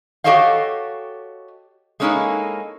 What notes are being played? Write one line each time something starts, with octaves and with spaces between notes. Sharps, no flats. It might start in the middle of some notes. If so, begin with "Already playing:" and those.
F#4 G4 A4 C#5 D#5 F5
G#3 A#3 C#4 D#4 E4 A4